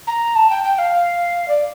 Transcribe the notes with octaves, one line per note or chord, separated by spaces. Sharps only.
A#5
A5
G5
G5
F5
D5